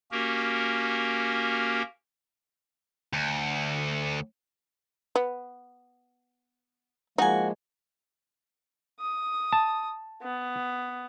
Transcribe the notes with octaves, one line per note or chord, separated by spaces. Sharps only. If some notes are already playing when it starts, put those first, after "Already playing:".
A#3 C#4 F#4 G4 A#4
D2
B3
F3 G#3 A#3 D#4 F#4 G#5
D#6
A5
B3